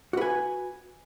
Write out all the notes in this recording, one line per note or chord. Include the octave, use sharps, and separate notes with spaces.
F#4 B4 G#5